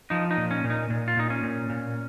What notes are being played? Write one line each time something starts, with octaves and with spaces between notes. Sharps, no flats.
F3 D#4
D#4
A#2
C#4
A#2
D#4
A#2
F4
A#2 D#4
C#4
A#2
A#2